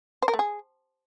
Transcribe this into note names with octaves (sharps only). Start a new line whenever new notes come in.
C5
A#4
A3
G#4